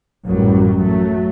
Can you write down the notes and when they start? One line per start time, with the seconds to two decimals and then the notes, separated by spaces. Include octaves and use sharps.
0.25 A1 F#2 F#3 G3
0.81 F#3 A3